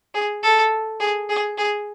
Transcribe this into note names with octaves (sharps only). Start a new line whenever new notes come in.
G#4
A4
G#4
G#4
G#4